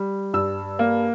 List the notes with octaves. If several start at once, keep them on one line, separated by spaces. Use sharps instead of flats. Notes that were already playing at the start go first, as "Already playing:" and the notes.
Already playing: G3
G2 E6
A#3